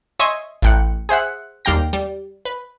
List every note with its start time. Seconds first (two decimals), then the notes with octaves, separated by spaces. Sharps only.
0.20 C#5 D#5 E5 G#5 C6
0.62 A1 A2 G5 F#6 C#7
1.09 G#4 C5 E5 F#5
1.65 D#2 G3 F5 G5 A#6
1.93 G3
2.45 B4